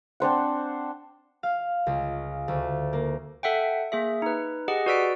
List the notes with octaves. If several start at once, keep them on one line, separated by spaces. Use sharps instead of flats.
C4 D4 C5 F#5
F5
C#2
D2
A#3
A4 E5 F#5 G5
A#3 G#4 E5
D#4 B4
G4 G#4 D#5 F#5
F#4 B4 D5 E6 B6 D7